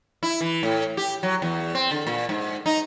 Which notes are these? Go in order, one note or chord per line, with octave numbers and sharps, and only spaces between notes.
E4
E3
A2
G4
F#3
E2
C4
D3
A#2
G#2
D#4